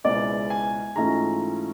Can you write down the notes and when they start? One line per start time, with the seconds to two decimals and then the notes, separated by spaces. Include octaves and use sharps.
0.04 C#2 B2 G#3 C4 E4 D5
0.50 G#5
0.96 G#2 E3 A3 C#4 F4 A#5